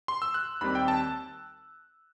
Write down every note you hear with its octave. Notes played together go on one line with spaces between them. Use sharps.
C6
E6
F#6
D#2 D#3 G3 C4 B5
G5
A5